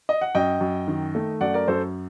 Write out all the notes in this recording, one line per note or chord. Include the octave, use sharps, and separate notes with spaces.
D#5
F#5
F#2 D#5 G5
F#2
D#3
A3
F#2 D5 F#5
A#4 D5
F#2 A4 C5